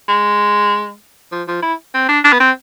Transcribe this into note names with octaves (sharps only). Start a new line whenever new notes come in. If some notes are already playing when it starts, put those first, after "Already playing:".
G#3
F3
F3
E4
C4
D4
D4
B3
C4